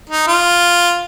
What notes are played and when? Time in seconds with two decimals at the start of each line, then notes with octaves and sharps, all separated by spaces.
0.10 D#4
0.27 F4